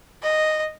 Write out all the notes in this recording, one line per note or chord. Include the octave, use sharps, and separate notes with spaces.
D#5